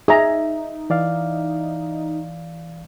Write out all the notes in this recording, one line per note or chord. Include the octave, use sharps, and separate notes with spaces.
D#4 G#4 E5 A#5
E3 D5 F5